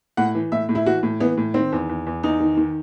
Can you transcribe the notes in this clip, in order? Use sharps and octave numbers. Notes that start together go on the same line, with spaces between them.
A2 F#5
E3
A2 E5
A2
E4
E3 F#4
A2
E3 B3
A2
D#3 C4
E2
E2
E2
E2 D#4
D#3
D#3